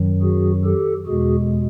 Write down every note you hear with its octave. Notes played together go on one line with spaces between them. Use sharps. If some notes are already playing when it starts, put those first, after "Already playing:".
Already playing: F#2 D#3 F#3
F#4 G#4
G4 A4
E2 B2 G#3 F#4 G#4